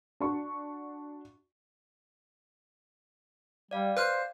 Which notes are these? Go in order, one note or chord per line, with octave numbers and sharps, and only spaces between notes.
D4 F#4 C#6
G3 D5 F5
B4 C5 F6 F#6